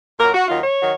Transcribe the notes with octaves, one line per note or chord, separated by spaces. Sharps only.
A#2 F#3 A#4
F#4
D#2 D#3 F#3 F4
C#5
D#3 F#3